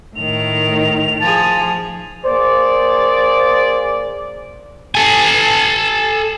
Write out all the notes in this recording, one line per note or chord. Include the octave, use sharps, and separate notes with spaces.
A2 D#3 F7
F3 G#4 A5
A#3 G#4 C5 D5
A4 G#5